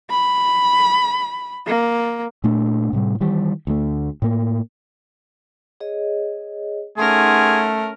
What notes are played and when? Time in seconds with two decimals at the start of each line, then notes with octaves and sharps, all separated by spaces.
0.11 B5
1.67 A#3
2.44 A#2 A3 D4
2.93 A2 C3 G3
3.20 D#3 E3 G3
3.67 D2 A3
4.22 A2 A#3
5.80 G#4 C#5 D#5
6.98 A3 C#4 D#4 G#4 A#4 F#5 C6